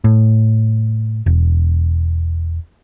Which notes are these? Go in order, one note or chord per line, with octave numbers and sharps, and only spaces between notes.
A2
E1